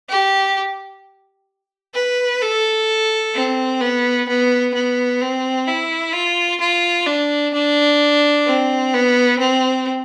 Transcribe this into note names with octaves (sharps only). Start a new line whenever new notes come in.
G4
B4
A4
C4
B3
B3
B3
C4
E4
F4
F4
D4
D4
C4
B3
C4